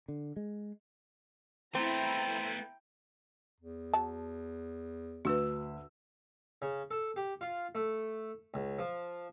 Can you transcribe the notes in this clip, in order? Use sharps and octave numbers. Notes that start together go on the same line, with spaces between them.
D3
G#3
A3 B3 C4 E4 G5 A#5
E2
F#3 A5
D2 D4 B4 E6
C#3
A4
G4
F4
A3
C#2
F3